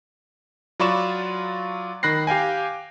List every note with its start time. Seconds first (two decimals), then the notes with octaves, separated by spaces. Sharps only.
0.80 F#3 F4 D5 B5 C#6 E7
2.03 D#3 B5 F#6 A#6 C7
2.27 G4 F5 G5 G#5